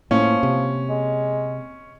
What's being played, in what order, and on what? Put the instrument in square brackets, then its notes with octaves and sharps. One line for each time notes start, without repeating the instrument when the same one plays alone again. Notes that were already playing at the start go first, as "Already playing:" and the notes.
[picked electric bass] A2 [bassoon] F3 [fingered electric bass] A#3 [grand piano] C#4
[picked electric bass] C3
[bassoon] G#3